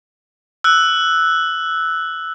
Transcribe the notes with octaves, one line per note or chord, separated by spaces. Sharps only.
E6 F#6